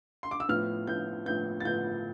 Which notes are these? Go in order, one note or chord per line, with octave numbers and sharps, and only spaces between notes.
C6
D6
E6
A2 F3 B3 F6
A2 F3 B3 G6
A2 F3 B3 G6
A6
A2 F3 B3 G6